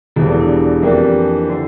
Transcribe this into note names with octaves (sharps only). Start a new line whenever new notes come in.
E1 E2 E3 G3 A4
E4
D4
F2 E3 A#3 D4 G4
D3